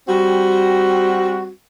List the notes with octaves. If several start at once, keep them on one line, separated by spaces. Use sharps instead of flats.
G3 C4 F#4